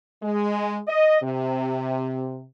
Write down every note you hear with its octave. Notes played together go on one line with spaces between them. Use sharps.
G#3
D#5
C3